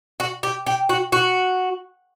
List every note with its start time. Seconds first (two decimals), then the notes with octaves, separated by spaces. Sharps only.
0.20 F#4
0.43 G4
0.66 G4
0.89 F#4
1.12 F#4